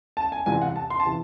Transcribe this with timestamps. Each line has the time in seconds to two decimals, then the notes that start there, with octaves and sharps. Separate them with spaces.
0.17 A5
0.32 G#5
0.46 C2 C3 E3 G#5
0.62 F#5
0.76 A5
0.90 C6
1.00 A5
1.06 C3 E3